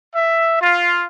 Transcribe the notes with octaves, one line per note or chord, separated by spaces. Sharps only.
E5
F4